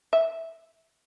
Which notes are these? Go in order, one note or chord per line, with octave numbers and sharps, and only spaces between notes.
E5